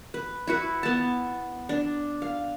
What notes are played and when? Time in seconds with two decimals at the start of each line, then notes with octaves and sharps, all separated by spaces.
0.14 B4
0.47 E4 F#4 B4
0.83 B3 A5
1.69 D4
2.22 F5